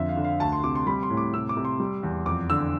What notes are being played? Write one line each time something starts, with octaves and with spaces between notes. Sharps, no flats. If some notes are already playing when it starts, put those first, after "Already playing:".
Already playing: F2 D3 E5
F5
D3
F5
D2 A5
C6
C3 D6
C6
G3 B5
C6
A2
D6
C3 E6
D6
C3
C6
G3
E2
F2 D6
D3 E6